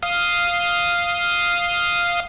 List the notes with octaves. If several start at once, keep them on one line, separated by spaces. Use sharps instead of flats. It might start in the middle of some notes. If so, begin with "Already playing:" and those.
F5 D#6